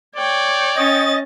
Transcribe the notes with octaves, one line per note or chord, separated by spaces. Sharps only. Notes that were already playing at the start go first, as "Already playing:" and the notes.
C#5 D5 G5
C#4 D#5 A6